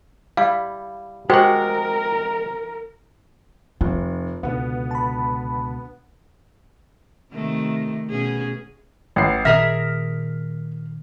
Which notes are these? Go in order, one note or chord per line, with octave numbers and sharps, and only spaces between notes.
G3 E4 F5
G#3 F#4 G4 A#4 C5 F#5 G5
F1 F4
C#2 B2 D3 B3
A5 B5
C3 D#3 A3
B2 C#4 G#4
A1 F#5 C7
A#2 D#3 G#4 A#4 E5 F6 A#6